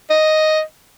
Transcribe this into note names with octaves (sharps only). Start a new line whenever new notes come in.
D#5